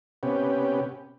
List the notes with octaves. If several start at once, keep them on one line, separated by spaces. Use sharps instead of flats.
C3 B3 C#4 G4